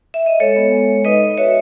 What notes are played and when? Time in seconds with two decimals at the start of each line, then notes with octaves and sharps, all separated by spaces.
0.14 E5
0.26 D#5
0.40 G#3 A4 C#5
0.56 B3
0.72 G#3
0.89 G#3
1.05 D#4 B4 D#5
1.22 D#4
1.38 F#4 C#5 E5